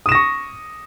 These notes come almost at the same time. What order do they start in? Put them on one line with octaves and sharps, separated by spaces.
D#6 E7 A#6 C#6